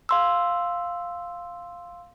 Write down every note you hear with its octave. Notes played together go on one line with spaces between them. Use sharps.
F5 C6 E6